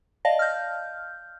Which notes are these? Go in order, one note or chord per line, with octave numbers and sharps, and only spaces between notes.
D5 D#5 F5 A5 A#6
F6 G6